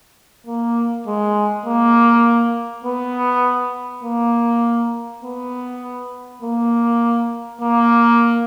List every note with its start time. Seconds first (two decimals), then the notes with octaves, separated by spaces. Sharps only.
0.47 A#3
1.07 G#3
1.66 A#3
2.85 B3
4.03 A#3
5.23 B3
6.42 A#3
7.61 A#3